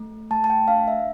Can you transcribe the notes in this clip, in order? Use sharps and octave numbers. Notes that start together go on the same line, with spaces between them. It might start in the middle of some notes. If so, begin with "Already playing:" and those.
Already playing: A3
A3 A5
A5
G5
D4 F5
E5